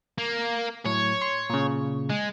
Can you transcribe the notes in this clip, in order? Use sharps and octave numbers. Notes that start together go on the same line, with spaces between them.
A#3
A2 F#3 C#5
C6
A#2 C#3
G#3